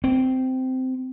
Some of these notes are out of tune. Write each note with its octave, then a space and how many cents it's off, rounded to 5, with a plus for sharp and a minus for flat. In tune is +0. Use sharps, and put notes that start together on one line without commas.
C4 -15